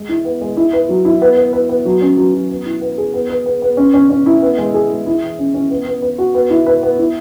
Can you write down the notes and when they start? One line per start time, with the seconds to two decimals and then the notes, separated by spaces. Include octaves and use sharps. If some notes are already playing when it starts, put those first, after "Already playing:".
Already playing: G#3
0.09 E4
0.25 B3
0.41 G#3
0.57 E4
0.73 B4
0.89 F#3
1.05 E4
1.22 B3
1.37 B3
1.53 B4
1.69 B3
1.86 F#3
2.01 C#4
2.17 F#3
2.34 F#3
2.49 B3
2.66 E4
2.81 B3
2.98 G#4
3.14 B3
3.29 B4
3.46 B3
3.62 B3
3.77 C#4
3.94 C#4
4.10 C#4
4.26 E4
4.42 B3
4.58 G#3
4.74 G#4
4.90 G#3
5.06 E4
5.22 E3
5.38 C#4
5.54 C#4
5.70 B3
5.86 B3
6.02 B4
6.18 F#4
6.34 B3
6.50 E4
6.66 B4
6.83 B3
6.99 E4